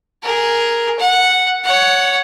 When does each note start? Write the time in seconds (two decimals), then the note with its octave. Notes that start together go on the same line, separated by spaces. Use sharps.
0.22 G#4 A#4
0.99 F#5
1.64 C#5 F#5